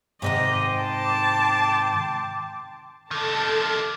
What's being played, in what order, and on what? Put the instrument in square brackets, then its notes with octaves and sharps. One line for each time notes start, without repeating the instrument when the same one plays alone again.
[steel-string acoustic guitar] G#2 C3 D#3 [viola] D#5 [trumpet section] G5 C6 D6
[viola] A5
[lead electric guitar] C3 D#3 [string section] A4 A5